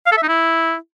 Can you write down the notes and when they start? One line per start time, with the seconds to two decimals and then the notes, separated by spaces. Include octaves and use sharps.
0.06 F5
0.12 A4
0.17 E5
0.23 D#4
0.28 E4